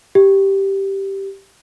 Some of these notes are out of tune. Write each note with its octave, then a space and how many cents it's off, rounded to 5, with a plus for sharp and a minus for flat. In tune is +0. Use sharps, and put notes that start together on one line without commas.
G4 -5